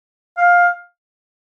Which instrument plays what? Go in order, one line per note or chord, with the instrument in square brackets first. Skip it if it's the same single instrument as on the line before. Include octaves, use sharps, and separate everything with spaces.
[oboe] F5